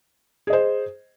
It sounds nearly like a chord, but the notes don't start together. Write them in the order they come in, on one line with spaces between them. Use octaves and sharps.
G#4 D#5 C5